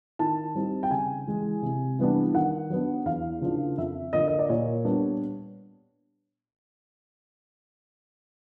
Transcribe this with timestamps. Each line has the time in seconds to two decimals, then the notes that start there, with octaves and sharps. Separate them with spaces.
0.19 D#3 A5
0.55 G3 C4 D#4
0.83 G5
0.91 C#3 G#5
1.27 E3 G#3
1.62 C3
1.99 E3 G3 B3 D4
2.34 D#3 F#5
2.70 F#3 B3 D4
3.06 E2 F5
3.41 C#3 F3 A#3 D4
3.78 F2 E5
4.13 D3 F3 A#3 D#5
4.28 D#5
4.39 D5
4.49 A#2 C#5
4.85 G3 B3 D4